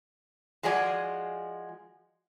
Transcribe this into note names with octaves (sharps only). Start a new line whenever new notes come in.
F3 G#3 F#4 G#4 D5 G#5